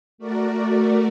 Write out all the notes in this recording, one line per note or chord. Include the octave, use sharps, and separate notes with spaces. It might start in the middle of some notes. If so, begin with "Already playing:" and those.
A3 F#4 A#4 D5